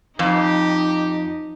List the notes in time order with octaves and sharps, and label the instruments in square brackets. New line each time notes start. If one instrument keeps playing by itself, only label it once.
[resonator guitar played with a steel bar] F2 [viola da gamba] D#4 [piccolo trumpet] G4